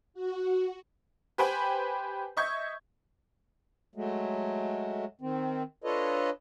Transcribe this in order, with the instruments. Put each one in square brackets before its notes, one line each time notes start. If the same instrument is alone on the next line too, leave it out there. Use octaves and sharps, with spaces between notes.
[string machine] F#4
[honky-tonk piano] G4 B4 C5 G5 G#5 B5
D#5 E5 C#6 G6 G#6
[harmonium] F#3 G#3 A3
D#3 C4
D4 F4 A4 B4 C#5 D#5